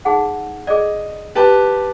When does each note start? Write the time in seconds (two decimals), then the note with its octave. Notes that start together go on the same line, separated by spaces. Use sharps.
0.05 D#4 G#4 F#5
0.67 G#4 D5 D#5
1.35 G4 B4 A5